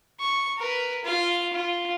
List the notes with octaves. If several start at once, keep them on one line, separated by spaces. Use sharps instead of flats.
C#6
A#4 B4
F4 F5
F4